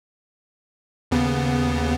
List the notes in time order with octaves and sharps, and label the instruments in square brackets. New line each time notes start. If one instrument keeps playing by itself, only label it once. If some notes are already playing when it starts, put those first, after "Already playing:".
[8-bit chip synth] D#2 C#3 B3